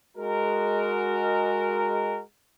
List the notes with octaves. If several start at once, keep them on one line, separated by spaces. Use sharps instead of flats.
G#3 F#4 A#4